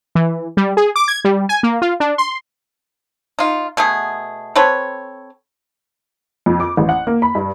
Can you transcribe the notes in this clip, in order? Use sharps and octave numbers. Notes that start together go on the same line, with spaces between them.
E3
G3
G#4
D6
G#6
G3
G#5
A#3
F4
D4
C6
D#4 F4
B2 A3 B3 G#4
C4 A4 B4 C#5
F2
D6
A1
F#5
A#3
B5
G2